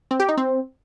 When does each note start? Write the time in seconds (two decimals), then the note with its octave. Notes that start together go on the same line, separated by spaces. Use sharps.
0.11 C4
0.20 G4
0.28 D#4
0.37 C4